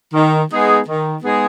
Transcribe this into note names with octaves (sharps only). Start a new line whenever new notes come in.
D#3
G#3 B3 D#4 G#4
D#3
G#3 B3 D#4 G#4